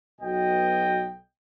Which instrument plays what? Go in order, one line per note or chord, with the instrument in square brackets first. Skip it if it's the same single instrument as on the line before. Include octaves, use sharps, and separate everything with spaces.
[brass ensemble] B1 B2 D#5 G5